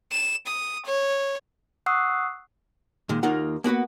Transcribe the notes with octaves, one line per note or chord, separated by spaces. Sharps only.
E7
D#6
C#5
F#5 C#6 D#6 E6 F#6 C7
A#2 D#3 G#3
D#2 A#3 D#4 F4 A#4 F#5
A#3 B3 F#4 B4